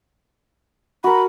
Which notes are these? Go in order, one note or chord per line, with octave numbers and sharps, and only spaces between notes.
F#4 A#4 B5